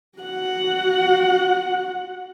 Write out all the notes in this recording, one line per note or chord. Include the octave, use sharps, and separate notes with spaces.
F#4 F#5